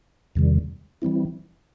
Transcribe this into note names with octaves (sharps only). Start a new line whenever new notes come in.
E2 C3 D#3 G3
E3 G3 C4 E4